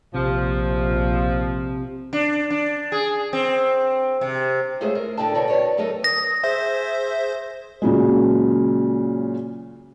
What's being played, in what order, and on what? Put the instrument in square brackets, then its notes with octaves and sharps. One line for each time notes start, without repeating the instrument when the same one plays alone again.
[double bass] A#1 [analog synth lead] C3 [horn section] F3
[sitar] D4
D4
G#4
C4
C3
[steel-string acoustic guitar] G#3 A3 C#4 F4 G#4 C5
A#4
A2 D3 B3 D4 G5 A5
D2 B2 D3 A#4 C#5 D5
F#4 B4 C#5 D5
D3 F#3 A3 D#4 A4 A#4
[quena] D#6 [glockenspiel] A#6
[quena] G#4 [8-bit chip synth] C5 [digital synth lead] E5
[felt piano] A#2 C#3 F#3 G#3